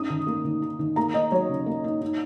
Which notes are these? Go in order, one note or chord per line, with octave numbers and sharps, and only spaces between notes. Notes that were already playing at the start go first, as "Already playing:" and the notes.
Already playing: C#4 D#4 D#6
D#3
A#3
D#3
D#4
D#3
A#3 A#5
D#4 D#5
F#3 C#5
C#3
A#3
D#4
D#4